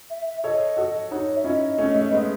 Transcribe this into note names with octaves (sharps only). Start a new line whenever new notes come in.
E5
E5
A4 C#5 D#5
F#4 A4
D#4 F#4 C#5
E5
C#4 E4 D#5
A3 C#4
A3
G#3 B3